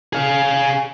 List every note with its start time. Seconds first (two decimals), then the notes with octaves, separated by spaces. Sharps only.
0.13 G#4 F5